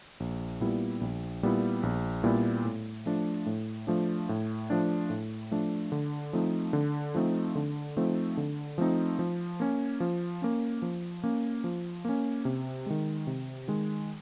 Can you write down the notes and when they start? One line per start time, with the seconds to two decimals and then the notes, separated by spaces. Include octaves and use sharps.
0.20 A#1
0.61 A#2 G3 B3 E4
1.01 A#1
1.43 A#2 G3 B3 E4
1.83 A#1
2.24 A#2 G3 B3 E4
2.65 A2
3.06 F3 A3 D4
3.46 A2
3.87 F3 A3 D4
4.29 A2
4.70 F3 A3 D4
5.10 A2
5.51 F3 A3 D4
5.92 D3
6.33 F3 A3 C4 D#4
6.73 D3
7.15 F3 A3 C4 D#4
7.55 D3
7.97 F3 A3 C4 D#4
8.37 D3
8.78 F3 A3 C4 D#4
9.19 F3
9.60 A#3 C#4
10.00 F3
10.42 A#3 C#4
10.82 F3
11.24 A#3 C#4
11.64 F3
12.05 A#3 C#4
12.45 C3
12.86 D#3 G#3
13.27 C3
13.68 D#3 G#3